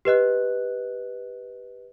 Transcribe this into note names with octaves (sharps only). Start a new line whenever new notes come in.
G4 B4 D#5 F#6